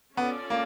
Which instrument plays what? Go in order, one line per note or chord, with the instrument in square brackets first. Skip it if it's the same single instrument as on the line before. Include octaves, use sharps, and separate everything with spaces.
[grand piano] B3 [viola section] C#4 F4 A4 D5
[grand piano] A#3